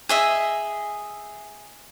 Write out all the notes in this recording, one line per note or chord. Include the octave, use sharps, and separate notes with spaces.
G#4 D#5 E5